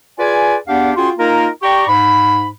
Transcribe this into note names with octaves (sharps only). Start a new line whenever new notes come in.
F4 G#4 B4 D5 G#5
E2 B3 D4 G4 F5 F#5
C#4 F4 F#4 G#4 G5 C6
A#3 D#4 F4 A#4
G4 D5 G5 A#5 C#6
G#2 B5